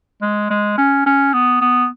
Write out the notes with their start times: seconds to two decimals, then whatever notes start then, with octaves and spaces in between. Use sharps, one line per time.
0.22 G#3
0.50 G#3
0.77 C#4
1.06 C#4
1.33 B3
1.61 B3